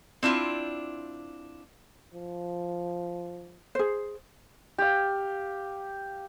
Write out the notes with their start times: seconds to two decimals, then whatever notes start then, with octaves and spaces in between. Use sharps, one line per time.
0.23 C4 D4 E4 F4
2.14 F3
3.75 G#4 C5
4.78 G4 F5